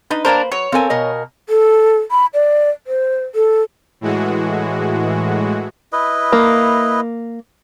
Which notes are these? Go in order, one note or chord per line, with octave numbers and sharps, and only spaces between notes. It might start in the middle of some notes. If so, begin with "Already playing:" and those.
D4 D#4 B4 D#5
A#3 D4 A#4 C5
F#3 C#5
C4 A4 A#4 F5 G#5
B2 A#4 D#5
A4
B5
D5
C5
A4
A2 E3 G#3 F#4
E4 B4 D#5
A#3